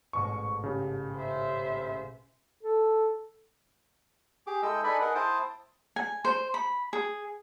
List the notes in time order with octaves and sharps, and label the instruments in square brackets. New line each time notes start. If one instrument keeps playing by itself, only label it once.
[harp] A1 G#2 B2 [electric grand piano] C#6
[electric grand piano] C#3 G4
[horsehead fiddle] C5 E5
[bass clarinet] A4
[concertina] G4 G#4 D6
G#3 E4 A4 D#5 G5 E6
D#4 A4 B4 D5 G#5 B5
D#4 G#4 A#4 F#5
E4 C5 G5 A5 D#6
[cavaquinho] G#5
C5
B5
G#4